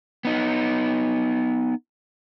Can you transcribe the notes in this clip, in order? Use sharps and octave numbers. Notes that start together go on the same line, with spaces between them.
B3 D#4